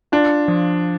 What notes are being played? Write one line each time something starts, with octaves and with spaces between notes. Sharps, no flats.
D4 F4
F3